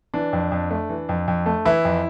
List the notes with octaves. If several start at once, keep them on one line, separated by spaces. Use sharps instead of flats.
E3 D4
F2
F2
A3
E3
F2
F2
A3
E3 E4
F2